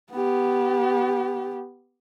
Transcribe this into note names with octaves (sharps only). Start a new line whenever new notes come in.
B3 G4